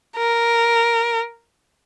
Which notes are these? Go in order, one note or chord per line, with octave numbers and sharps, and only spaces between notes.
A#4